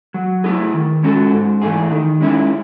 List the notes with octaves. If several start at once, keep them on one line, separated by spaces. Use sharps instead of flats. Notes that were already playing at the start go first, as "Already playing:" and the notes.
F#3
A3 E4 G#4
D#3
G#3 C#4 F#4 A4
G#2
E3 A3 E4 G#4
D#3
G#3 C#4 E4